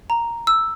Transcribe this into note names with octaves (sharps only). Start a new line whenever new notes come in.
A#5
E6